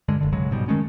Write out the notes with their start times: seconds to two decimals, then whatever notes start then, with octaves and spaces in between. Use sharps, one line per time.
0.08 G2 D3 G#3
0.21 F#1 D3
0.32 B1 C#3 F#3 G#3
0.51 G#2 B2 G3
0.68 D#3 G#3 A3 C#4